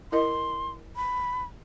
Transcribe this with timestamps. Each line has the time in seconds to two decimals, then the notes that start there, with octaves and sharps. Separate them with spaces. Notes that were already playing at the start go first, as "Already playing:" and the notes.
0.12 E4 A#4 D#5 C6
0.96 B5